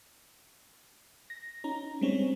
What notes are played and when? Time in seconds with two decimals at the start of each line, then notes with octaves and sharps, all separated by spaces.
1.30 A#6
1.64 C#4 D#4 A#5
2.01 G3 G#3 C4 C#4 C#5